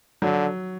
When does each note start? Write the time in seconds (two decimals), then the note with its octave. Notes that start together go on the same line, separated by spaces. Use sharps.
0.22 D3 F#3